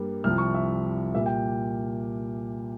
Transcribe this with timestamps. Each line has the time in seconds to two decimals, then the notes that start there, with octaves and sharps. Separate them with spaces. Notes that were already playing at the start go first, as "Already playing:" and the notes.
Already playing: G2 G3 A#3
0.24 C2 C3 F3 F6
0.38 C#6
0.54 E5
1.14 A#2 G3 A#3 E5
1.26 G5